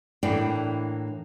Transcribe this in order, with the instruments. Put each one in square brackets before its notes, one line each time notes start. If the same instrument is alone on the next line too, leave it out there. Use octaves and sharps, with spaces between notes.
[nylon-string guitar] A2 E3 A#3 D4 E4 G5